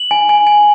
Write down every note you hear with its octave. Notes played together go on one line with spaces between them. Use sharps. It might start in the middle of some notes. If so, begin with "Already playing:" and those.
Already playing: F#7
G#5
G#5
G#5